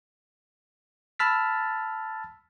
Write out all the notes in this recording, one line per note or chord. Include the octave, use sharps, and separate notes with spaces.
A5 B5 E6 F6 A6 B6